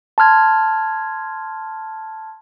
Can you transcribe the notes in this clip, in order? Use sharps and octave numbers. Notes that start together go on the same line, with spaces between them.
A5 C6 F6 G#6